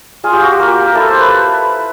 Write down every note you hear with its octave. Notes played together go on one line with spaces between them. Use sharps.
F4 G#4
G4
F#4
G4
A#3
A#4
E4 A4
C5
B4